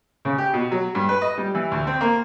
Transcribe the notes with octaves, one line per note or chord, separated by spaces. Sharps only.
C#3
G4
B2
F#3
G2
B4
D#5
G3
E3
D2
C4
A#3